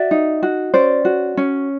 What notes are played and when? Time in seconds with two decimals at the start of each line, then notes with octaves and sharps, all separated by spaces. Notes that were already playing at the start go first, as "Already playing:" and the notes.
Already playing: F#4 D5 E5
0.11 D#4
0.43 F#4
0.74 C#4 C5 D5
1.05 F#4
1.37 C#4